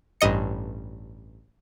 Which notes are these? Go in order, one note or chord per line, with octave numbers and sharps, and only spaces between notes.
A1 G2 D#5 C#7